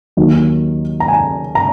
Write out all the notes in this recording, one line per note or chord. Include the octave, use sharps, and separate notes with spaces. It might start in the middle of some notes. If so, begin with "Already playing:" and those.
D#2 D#3 F#3
A#5
G#5
A#5